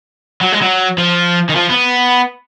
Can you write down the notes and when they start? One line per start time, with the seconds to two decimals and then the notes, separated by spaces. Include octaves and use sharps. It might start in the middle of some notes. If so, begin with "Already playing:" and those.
0.41 F#3
0.52 G#3
0.61 F#3
0.98 F3
1.50 D#3
1.56 F3
1.70 B3